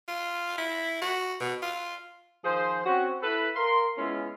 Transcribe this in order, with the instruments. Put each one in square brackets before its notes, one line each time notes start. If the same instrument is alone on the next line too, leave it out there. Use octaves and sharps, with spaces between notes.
[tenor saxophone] F4
E4
F#4
B2
F4
[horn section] D#3 F3 G#4 C5
C4 C#4 F#4
E4 A4 B4
A#4 F5 C6
G#3 B3 C#4 E4 F4